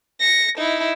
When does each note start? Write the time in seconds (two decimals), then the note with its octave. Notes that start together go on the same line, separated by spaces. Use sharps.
0.20 A#6 C#7
0.58 D#4 E4